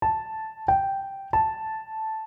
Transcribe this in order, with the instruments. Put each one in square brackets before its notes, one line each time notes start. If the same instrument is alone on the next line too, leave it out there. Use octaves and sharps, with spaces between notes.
[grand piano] A5
G5
A5